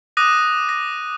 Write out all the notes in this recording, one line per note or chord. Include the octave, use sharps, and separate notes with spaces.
D6 D#6 F#6 A#6 D#7
A#6